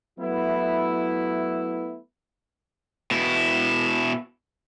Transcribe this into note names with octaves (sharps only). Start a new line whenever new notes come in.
F#3 A3 B3 E4
B2 E4